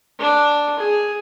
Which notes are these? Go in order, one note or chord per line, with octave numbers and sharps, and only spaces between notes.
D4
G#4